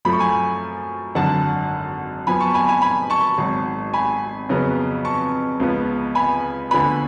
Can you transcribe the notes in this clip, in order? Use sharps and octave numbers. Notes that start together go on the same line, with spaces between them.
F#2 F3 A3 B5
C#6
G#5 B5
G#1 F#2 D3 F#5 A5
F#2 F3 B3 G#5 B5
A5 C#6
G#5 B5
G#5 B5
G#5 B5
A5 C#6
G#1 G#2 F#3
G#5 B5
F2 C#3 F#3 B3
A5 C#6
C#2 C#3 F3 B3
G#5 B5
D2 D3 F3 B3 G#5 B5